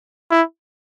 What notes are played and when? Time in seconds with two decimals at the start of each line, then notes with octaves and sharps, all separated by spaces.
0.31 E4